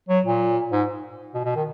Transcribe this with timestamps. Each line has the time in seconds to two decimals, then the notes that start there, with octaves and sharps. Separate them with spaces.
0.09 F#3
0.25 A#2
0.72 G#2
1.34 B2
1.45 B2
1.56 D#3